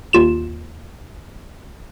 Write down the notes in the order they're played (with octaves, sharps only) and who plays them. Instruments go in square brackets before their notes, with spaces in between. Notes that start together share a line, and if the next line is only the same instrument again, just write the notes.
[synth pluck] D#2 F4 E7